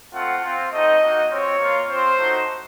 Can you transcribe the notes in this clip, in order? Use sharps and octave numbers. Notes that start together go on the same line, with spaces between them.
A3 C4 F4 F#5
C4 F4
A3 C4 D#4 D#5
A#3 D#4 F#4
C4 F4 C#5
A#3 F4
C4 F4 C5
A3 D#4 F#4